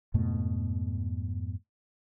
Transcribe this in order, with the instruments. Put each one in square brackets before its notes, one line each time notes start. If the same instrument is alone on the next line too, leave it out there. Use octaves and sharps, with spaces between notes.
[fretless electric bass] F2 G#2 B2 A3